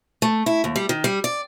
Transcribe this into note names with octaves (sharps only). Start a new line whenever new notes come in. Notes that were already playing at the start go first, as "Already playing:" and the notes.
A3
E4
D#2
G3
D#3
G3
D5